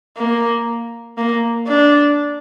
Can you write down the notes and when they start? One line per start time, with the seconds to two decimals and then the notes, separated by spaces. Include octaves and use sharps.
0.18 A#3
1.18 A#3
1.68 D4